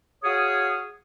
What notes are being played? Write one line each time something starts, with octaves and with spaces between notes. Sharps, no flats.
F#4 G#4 C#5 F5 D#6